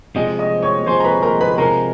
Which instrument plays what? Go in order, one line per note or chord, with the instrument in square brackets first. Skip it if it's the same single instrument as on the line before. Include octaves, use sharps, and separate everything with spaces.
[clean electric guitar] C3 F3 G#3 [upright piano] D#5 D#6
[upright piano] D#5 D#6
C#5 C#6
[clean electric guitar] C3 F3 G#3 [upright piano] C5 C6
[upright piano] A#5
B4 B5
A#4 A#5
B4 B5
[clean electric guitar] C3 F3 G#3 [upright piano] A#4 A#5